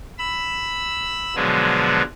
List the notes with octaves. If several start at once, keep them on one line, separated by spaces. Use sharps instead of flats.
B5 E6
B2 D3 F3 F#3 G#3 B3